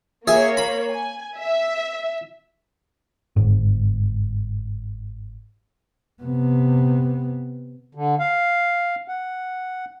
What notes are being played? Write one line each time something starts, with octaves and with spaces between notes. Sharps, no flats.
A#3 G#4 C#5 E5
B5
G#5
E5
G1 G#2
C3 B3
D3
F5
F#5